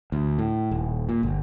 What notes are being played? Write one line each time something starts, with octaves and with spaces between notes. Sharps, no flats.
D2
A2
D#1
A#2
G1